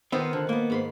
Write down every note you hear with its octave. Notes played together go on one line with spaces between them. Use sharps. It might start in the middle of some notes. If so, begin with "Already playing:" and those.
D#3 B3 C4 F4 C5
D3 F#5
A#3 B3
G#2 B5 C6